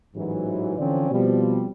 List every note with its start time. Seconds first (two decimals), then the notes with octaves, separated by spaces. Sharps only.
0.15 A1 G#2 E3 F#3
0.78 D3 E3 F3 C4 C#4 D5
1.11 B2 F3 G3 C4